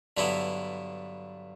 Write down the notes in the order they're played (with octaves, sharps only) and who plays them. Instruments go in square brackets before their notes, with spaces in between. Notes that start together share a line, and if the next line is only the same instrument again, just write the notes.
[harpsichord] G2 D3 F#3 B3 E4